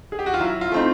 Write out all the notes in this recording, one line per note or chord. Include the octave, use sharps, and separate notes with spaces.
G#4
G4
F#4
F4
F#3 E4
F4
A3 C4 D#4